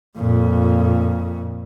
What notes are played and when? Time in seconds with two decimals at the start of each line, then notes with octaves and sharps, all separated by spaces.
0.17 F2 A#2